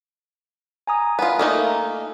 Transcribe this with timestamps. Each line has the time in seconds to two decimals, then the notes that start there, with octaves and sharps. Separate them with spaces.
0.87 G#5 A#5 D#6
1.19 B3 F4
1.39 A3 A#3 D#4